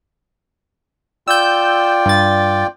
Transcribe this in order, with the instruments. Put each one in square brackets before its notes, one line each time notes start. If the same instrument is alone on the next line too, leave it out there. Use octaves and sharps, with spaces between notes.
[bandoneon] F4 D5 G5 [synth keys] E6 G6
[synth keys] G2 A6